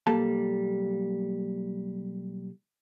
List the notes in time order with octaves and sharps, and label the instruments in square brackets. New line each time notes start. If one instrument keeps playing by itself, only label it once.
[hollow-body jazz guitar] B1 G3 A#3 A4 A5